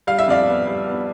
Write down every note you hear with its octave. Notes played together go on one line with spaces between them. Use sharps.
G3 F5
E5
F2 D5 F5
B3
G3
B3